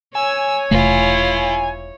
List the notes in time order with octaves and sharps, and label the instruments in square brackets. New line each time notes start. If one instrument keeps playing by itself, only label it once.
[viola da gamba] C#5 [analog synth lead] G#5 [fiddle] E6
[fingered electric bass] E1 C3 A3 [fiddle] E4 F4